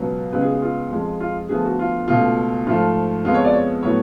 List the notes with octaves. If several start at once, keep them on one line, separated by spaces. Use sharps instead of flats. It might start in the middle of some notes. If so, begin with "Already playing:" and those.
Already playing: C#2 B2 F#3 B3 B4
C#2 C#3 G#3 B3 B4
G#4
G#4
F4
F2 F3 G#3
F4
D2 D3 F3 B3 G#4
F#4
F4
C#2 B2 A3 F4
G#2 F3 A3 F4
F2 F3 G#3 B3 F4
C#5
D5
C#5
A2 F#3 B3 C#5